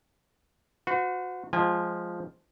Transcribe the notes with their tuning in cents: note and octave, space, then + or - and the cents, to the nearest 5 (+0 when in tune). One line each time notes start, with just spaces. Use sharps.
F#4 -25 C5 -45
F3 +0 G#3 +0 G#5 -35